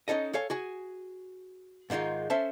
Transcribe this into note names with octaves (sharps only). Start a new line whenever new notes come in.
C#4 D#4 A4 D#5
A4 C#5 F5 G#5
F#4 G#4 G#5
G#2 D#3 G#3 D#4 F4
C#4 A4 C5 E5 A5